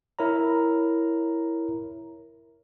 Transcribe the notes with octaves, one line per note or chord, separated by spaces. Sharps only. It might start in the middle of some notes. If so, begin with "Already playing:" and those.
E4 A#4 C#5 A#5